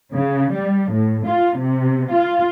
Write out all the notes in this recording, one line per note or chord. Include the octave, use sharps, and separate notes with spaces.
C#3
G3
A2
F4
C3
F4